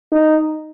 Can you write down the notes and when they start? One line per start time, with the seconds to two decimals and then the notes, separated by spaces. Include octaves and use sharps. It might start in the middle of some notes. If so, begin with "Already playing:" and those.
0.12 D#4